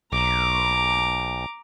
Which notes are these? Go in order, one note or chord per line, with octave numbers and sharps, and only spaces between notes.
B1 A#5 D6